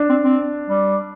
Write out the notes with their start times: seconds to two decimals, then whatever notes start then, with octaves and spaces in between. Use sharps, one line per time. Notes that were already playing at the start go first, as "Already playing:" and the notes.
Already playing: D4
0.09 C4
0.24 C4
0.69 G3